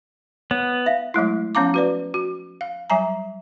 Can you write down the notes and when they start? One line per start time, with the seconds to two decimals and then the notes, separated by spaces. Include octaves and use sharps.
0.51 B3 C#5
0.86 E5 F5
1.14 F#3 G#3 A3 E4
1.55 F3 B3 C#4 F5 A#5 D6
1.74 F#4 B4 D5
2.14 F#4
2.61 F5
2.90 F#3 G3 E5 G#5 A#5